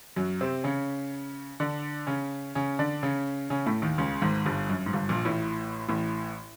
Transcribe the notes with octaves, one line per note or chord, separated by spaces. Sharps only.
F#2 F#3
C3 C4
C#3 C#4
D3 D4
C#3 C#4
C#3 C#4
D3 D4
C#3 C#4
C#3 C#4
A2 A3
D#2 D#3
C#2 C#3
G#1 G#2
G1 G2
F#2
G#2
G1 G2
A#1 A#2
A1 A2
A1 A2